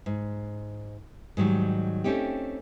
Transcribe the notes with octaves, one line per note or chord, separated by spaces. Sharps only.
G#2
G#2 D#3 F#3 G3
A3 C4 C#4 D#4 G4